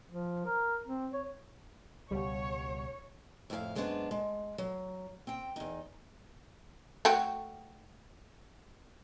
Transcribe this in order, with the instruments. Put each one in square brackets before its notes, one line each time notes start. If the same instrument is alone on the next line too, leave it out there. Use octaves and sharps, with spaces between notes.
[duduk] F3
A#4
C4
C#5
[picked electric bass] C#2 B2 [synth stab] G3 [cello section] C#5
[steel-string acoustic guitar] F2 A2 E4 F#4 F5
F#2 G#3 B3 C4 D4 A5
G#3
F#3
C4 G5
E2 D#4
[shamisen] A3 F#4 G5